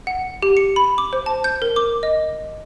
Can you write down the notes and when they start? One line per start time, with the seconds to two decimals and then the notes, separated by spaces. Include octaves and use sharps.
0.07 F#5
0.43 G4
0.57 C#7
0.76 B5
0.98 D6
1.13 C5
1.26 A5
1.44 G6
1.62 A#4
1.76 D6
2.03 D#5